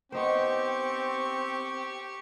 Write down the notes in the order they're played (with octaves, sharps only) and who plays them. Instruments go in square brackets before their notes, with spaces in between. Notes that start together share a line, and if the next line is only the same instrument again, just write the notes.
[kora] B3 D#4 C5 [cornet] C4 [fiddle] G4 C#6